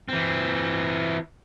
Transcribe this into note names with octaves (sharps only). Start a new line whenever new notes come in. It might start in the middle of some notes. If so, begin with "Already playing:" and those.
E3 C4